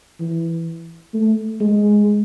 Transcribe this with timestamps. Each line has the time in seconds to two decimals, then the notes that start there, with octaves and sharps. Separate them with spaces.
0.20 E3
1.14 A3
1.60 G#3